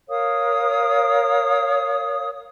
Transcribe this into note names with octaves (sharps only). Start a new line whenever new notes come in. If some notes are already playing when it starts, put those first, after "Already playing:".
A#4 C#5 F5 D#6